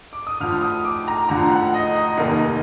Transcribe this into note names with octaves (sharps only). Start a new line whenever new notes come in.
D6
D#6
D2 D3 F3 F6
D#6
D6
A#5
D2 D3 F3 A#5
F#5
D#5
D#5
F1 D#2 D#3 A#3